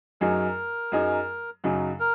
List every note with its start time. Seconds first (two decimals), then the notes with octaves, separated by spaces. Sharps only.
0.21 F#2 F#3 D#4 G#4 A#4
0.92 F#2 F#3 D#4 G#4
1.64 F#2 C#3 F#3 D#4
2.00 A#4